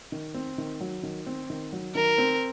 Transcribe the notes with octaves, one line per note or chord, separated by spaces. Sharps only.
D#3
C4
D#3
F#3
D#3
C4
D#3
F#3
D#3 A#4
C4